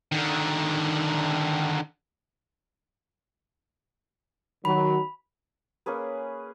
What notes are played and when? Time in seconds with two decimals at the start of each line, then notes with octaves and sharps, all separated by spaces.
0.12 D3 D#3
4.65 D#3 F#3 B5
5.86 A#3 C#4 G#4 B4